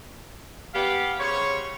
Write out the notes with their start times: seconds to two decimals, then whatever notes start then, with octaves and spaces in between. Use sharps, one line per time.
0.75 B3 G4 F5
1.19 C#3 G3 C5 C#5